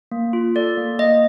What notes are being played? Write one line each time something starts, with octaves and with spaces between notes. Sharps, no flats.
A#3
F4
A4 D5
A#3
A#3 D#5